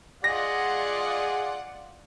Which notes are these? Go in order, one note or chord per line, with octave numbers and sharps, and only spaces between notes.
F4 G#4 D5 D#5 F#5 A#6